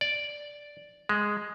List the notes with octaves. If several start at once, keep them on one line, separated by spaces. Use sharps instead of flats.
D5
G#3